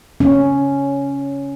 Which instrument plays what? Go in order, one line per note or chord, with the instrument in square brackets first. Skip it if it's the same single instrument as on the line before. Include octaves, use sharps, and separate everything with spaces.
[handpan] C#4